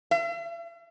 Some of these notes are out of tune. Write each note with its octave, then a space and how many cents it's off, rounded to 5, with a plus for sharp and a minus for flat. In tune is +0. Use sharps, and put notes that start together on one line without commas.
E5 +45